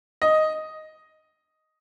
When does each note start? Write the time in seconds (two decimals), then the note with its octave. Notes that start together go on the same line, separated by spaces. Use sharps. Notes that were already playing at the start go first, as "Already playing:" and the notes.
0.22 D#5